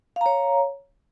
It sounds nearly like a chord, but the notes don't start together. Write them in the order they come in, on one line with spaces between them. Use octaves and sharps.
F5 A#5 C#5